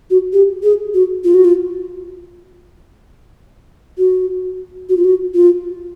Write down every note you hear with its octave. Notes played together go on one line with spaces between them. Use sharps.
F#4
G4
G#4
F#4
F4
F#4
F4
F#4
F#4
F4
F#4
F4